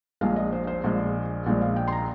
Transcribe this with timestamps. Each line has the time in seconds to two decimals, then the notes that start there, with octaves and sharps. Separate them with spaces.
0.21 A#1 A#2 G#3 F5
0.36 D#5
0.52 C5
0.67 C5
0.84 A#1 A#2 G#3
1.46 A#1 A#2 G#3
1.62 F5
1.76 G5
1.88 C6
1.92 A#5